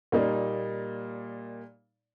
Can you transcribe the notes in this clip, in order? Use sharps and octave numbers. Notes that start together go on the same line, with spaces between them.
A#2 G3 A#3 D#4